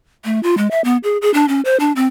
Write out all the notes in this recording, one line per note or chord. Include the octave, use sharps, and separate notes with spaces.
A3
F4
G#3
E5
B3
G#4
G#4
D4
C#4
C5
D4
C4